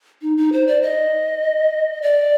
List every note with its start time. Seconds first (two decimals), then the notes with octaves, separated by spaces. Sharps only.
0.22 D#4
0.37 D#4
0.52 C5
0.67 D5
0.82 D#5
2.02 D5